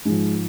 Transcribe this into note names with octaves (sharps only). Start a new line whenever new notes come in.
G#2 F3 G#3